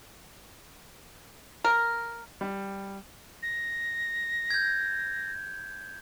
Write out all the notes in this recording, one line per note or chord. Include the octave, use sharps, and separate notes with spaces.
A#4
G3
A#6
G6 G#6